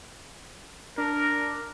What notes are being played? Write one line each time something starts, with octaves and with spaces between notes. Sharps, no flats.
D4 A#4